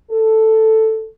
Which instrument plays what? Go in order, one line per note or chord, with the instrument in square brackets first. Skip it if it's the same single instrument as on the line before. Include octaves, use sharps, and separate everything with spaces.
[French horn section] A4